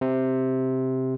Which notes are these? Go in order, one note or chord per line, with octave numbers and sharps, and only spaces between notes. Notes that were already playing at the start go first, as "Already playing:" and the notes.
C3